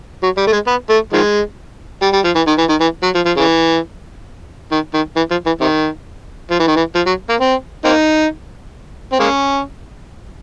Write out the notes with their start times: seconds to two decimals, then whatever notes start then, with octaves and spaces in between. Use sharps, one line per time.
0.23 F#3
0.37 G3
0.47 A3
0.53 G#3
0.67 B3
0.90 A3
1.13 D#3 F3 G#3
2.02 G3
2.13 G3
2.25 F3
2.35 E3
2.47 D#3
2.58 E3
2.69 D#3
2.81 E3
3.03 F#3
3.15 F3
3.26 F3
3.37 C#3 E3
4.72 D#3
4.94 D#3
5.16 E3
5.31 F3
5.46 E3
5.61 C3 D#3
6.51 F3
6.59 E3
6.67 D#3
6.76 E3
6.95 F3
7.07 F#3
7.29 A#3
7.40 C4
7.85 A#3 C4 D#4
9.13 C4
9.20 G#3 A#3 C#4